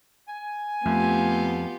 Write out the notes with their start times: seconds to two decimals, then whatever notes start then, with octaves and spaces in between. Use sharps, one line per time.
0.28 G#5
0.86 F2 A3 B3 F4 G4